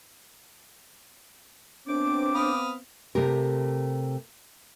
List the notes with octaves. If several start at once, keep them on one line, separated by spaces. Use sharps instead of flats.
F#2 B3 C4 D4 C5 D6
F5 B5 D#6
C3 A3 G4 A#4